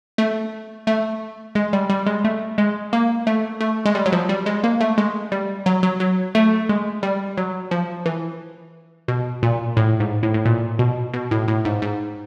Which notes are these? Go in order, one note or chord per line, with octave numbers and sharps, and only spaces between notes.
A3
A3
G#3
G3
G3
G#3
A3
G#3
A#3
A3
A3
G#3
G3
F#3
F3
G3
G#3
A#3
A3
G#3
G3
F#3
F#3
F#3
A3
G#3
G3
F#3
F3
E3
B2
A#2
A2
G#2
A2
A2
A#2
B2
B2
A2
A2
G#2
G#2